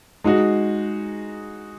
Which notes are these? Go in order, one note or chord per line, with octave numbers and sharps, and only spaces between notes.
G#3 D#4 F#4